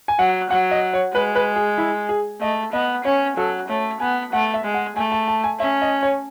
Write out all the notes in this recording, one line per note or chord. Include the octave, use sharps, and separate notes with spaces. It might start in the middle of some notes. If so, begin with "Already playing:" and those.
G#5
F#3 F#5
F#3 F#5
D#5
C#5
G#3 B4
B4
G#4
E4
G#4
A3 D#5
B3 D#5
C#4 C#5
F#3 A4
A3 C#5
B3 G#5
A3 F#5
E5
G#3
F#5
A3 G#5
A5
A5
G#5
C#4 E5
D#5
C#5